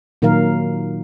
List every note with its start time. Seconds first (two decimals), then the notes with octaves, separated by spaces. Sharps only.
0.22 A#2 D#3 F#3 A#4 F5